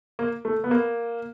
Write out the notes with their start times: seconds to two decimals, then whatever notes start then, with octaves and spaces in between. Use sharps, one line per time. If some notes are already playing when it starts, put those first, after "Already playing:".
0.19 A#3
0.45 A3
0.64 B3
0.71 A#3